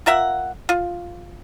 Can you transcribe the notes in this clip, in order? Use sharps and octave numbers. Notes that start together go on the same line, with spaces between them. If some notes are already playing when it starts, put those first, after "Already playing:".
F4 A#4 E5 F#5
F4